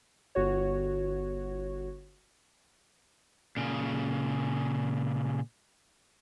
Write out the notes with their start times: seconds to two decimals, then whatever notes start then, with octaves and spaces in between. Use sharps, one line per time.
0.35 G1 F#4 C#5
3.57 A#2 C#3